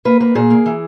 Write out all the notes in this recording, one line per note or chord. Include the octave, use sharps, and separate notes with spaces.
A#3 B4
A#3 B4
A#2 G#4
A#3
E3